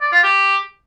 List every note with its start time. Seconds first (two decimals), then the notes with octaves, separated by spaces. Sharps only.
0.01 D5
0.12 F4
0.23 G4